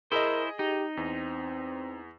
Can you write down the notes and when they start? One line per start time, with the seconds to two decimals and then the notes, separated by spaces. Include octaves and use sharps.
0.12 E4 G#4 A#4 C5 D#5
0.59 D#4 G4
0.97 E2 C4